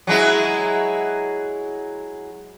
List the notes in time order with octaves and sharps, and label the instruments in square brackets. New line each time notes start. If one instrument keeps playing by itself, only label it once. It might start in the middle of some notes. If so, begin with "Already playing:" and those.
[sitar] F#3 G#3 E4